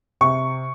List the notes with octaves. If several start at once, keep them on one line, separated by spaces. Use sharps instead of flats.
C3 C#6